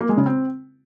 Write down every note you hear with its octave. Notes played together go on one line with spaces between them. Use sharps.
A#3
G#3
C#3
C4